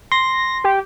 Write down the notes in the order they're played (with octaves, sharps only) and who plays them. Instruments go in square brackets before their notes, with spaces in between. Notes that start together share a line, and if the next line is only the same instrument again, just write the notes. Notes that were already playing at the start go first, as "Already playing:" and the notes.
[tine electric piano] C6 [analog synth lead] A#6
[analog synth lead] G4